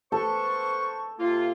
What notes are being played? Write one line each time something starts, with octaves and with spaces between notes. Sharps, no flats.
B3 A4 C5 C#6
C3 A#3 F4